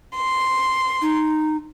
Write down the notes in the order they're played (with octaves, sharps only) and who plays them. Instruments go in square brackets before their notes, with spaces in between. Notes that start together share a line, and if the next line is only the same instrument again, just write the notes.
[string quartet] C6
[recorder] D#4